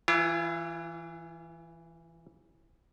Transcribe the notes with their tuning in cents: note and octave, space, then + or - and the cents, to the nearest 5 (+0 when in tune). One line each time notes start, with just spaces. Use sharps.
E3 +0 F4 -45